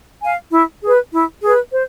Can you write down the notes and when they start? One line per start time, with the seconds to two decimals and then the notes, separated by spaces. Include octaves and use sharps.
0.22 F5 G#5
0.51 E4
0.82 G#4 B4
1.13 E4
1.42 G#4 B4
1.73 C5